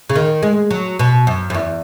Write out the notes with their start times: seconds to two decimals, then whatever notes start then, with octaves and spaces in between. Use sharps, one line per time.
0.10 C#3
0.15 D#3
0.43 G#3
0.71 F#3
0.99 B2
1.27 F#2
1.50 F#2
1.54 E2